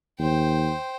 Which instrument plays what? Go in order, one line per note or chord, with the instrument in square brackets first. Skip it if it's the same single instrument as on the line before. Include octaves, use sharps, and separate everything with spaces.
[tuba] D#2 [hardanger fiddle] C5 G5